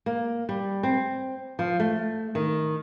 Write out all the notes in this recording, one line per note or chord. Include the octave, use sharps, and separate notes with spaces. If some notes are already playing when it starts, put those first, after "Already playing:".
A#3
G3
C4
F3
A3
D#3